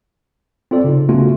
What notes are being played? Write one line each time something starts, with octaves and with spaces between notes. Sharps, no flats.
C4 F4 A4 D5
C#3 D#4
C#3 A3 B3 C#4 F4 F#4